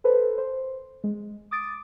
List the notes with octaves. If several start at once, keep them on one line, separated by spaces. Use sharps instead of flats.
A4 B4 C5
C5
G#3
D6 D#6 A6 D7